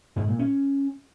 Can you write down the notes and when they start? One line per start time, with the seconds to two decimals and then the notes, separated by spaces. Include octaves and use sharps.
0.16 G#2
0.28 A#2
0.39 C#4